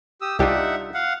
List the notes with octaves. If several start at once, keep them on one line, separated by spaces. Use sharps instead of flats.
G4 D#6 E6
C2 G3 D4 D#4 F4 G4 E5 F#5
F5 F#5